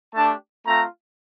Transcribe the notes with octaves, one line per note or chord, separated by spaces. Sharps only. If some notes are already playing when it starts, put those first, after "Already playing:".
A3 D4 G4 A5
A3 C4 F4 A#5